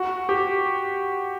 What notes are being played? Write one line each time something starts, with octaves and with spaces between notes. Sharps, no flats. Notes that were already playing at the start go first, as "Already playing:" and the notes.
Already playing: F#4
G4